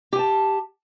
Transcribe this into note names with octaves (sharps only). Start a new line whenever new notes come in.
G4 G#5 A5